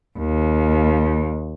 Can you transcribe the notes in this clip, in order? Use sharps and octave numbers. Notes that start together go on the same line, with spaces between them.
D#2